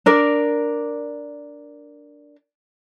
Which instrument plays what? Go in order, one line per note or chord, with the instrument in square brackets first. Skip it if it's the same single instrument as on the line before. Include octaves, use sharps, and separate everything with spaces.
[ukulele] D4 A#4 D5